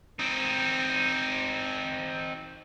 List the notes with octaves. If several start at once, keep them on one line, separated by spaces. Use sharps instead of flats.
C4 D#4